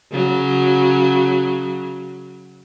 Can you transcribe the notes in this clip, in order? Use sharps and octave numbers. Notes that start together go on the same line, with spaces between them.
C#3 F#3